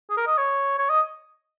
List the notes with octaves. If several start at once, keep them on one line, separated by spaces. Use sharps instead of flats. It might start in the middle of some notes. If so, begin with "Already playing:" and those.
G#4
A#4
D#5
C#5
C#5
D#5